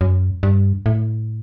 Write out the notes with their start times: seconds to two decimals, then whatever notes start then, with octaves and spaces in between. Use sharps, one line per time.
0.01 F#2
0.43 G2
0.86 A2